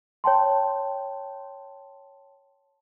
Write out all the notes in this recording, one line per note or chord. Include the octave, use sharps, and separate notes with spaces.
C#5 G5 A5 C6